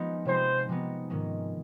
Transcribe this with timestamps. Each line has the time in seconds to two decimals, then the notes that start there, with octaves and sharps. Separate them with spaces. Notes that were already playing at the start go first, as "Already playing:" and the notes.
Already playing: F3 G#3 B3 D#4
0.25 C3 F3 G#3 B3 D#4 C5
0.69 C3 F3 G#3 B3 D#4
1.10 G#2 D#3 G#3 C#4